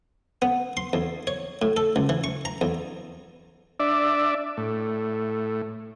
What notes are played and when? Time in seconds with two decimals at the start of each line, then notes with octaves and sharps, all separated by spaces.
0.42 B3
0.77 C6
0.93 E2
1.27 C#5
1.62 A2
1.77 A4
1.96 C#2
2.09 E3
2.24 C#6
2.45 A#5
2.61 E2
3.80 D4 D5 E5
4.57 A2